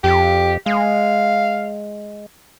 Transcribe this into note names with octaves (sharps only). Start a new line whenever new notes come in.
F2 G4
G#3 F5